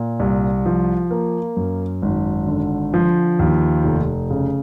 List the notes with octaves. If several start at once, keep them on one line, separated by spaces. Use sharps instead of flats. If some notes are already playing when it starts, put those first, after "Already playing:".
Already playing: A#2
C2
F3
A#3
F#2
G#1
D3
F3
D#2
F1
C#3